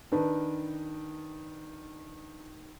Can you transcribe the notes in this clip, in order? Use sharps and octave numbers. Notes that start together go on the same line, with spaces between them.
D#3 D4 B4